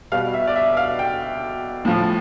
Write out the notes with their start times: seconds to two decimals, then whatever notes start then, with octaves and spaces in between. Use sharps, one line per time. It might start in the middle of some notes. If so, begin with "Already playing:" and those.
0.12 B2 G3 F5
0.34 E5
0.47 D5
0.56 E5
0.77 F5
0.99 G5
1.85 A2 F3